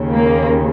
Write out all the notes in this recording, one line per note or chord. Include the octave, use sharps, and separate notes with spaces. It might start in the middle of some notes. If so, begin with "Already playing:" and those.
Already playing: D#2 C#3
A#3